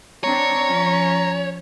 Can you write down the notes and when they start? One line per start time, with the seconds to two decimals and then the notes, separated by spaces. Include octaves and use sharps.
0.24 C4 D4 C#5 A#5
0.67 F3 C#4